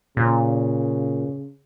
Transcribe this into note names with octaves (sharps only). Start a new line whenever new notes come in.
A#2 C#3